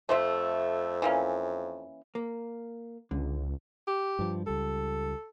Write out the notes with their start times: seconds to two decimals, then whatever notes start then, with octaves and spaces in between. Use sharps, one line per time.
0.09 F2 A3 C5 E5
1.02 E3 A#3 C#4
2.15 A#3
3.11 C#2 D3
3.87 G4
4.19 G2 F3
4.47 C#2 G3 A4